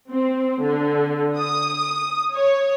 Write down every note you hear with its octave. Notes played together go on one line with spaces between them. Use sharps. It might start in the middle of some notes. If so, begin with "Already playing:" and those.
C4
D3
D#6
C#5